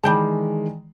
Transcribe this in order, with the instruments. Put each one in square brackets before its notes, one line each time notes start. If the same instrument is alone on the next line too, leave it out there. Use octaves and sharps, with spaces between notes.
[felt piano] D#3 E3 G#3 [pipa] G3 G5 A5